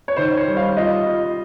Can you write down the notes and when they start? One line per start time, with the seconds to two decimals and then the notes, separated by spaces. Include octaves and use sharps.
0.08 C#5
0.16 D#3 C5
0.37 C#5
0.48 G3
0.57 F5
0.77 F4 D#5
1.07 F4